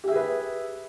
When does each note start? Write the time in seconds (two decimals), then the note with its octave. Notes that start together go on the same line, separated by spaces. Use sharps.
0.04 G4
0.08 E5
0.12 G#4
0.16 B4